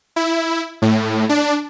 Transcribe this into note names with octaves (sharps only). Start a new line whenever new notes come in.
E4
A2
D4